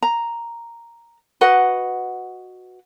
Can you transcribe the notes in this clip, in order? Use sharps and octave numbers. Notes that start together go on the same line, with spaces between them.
A#5
F#4 B4 D#5 F#5